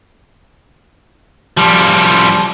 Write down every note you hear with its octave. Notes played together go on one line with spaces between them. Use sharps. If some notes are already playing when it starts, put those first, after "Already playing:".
F3 G3